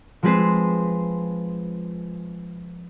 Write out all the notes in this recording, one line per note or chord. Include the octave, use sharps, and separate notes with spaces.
F3 G#3 C4 G#4 B4 C5